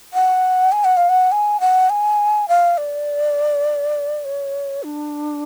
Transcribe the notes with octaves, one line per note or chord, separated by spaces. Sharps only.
F#5
G#5
F#5
F5
F#5
G#5
F#5
G#5
F5
D5
C#5
D4